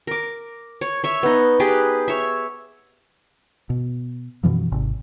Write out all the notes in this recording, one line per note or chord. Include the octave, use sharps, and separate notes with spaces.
A#4 D6
C#5
C#5 E5
B3 D#4
G4 G#4 B4
C#5 E5
B2
F#2 B2 E3 F3
G#1 C3